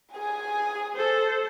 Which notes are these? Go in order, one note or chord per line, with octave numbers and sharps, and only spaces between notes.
G#4 G#5
A4 C5